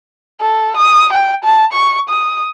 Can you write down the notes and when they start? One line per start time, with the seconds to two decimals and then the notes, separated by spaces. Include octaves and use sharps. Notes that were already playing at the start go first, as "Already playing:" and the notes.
0.41 A4
0.77 D#6
1.13 G5
1.44 A5
1.73 C#6
2.09 D#6